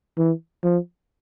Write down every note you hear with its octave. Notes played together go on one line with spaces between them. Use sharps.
E3
F3